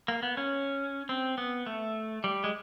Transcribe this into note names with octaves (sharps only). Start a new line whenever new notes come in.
A#3
B3
C#4
C4
B3
A3
G3
G#3